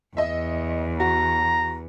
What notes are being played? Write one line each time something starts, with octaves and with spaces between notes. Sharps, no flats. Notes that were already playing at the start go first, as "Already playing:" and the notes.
E2 D#5 E5
F#4 A#5